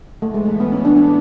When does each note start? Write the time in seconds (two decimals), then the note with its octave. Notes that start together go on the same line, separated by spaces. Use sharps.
0.22 A2 E3 A3 B3
0.34 G#3
0.45 A3
0.60 B3
0.72 C#4
0.85 D4
0.96 D4